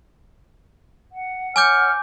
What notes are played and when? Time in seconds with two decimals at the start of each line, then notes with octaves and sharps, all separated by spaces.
1.12 F#5
1.56 C#5 F#5 G#5 D6 F6 G6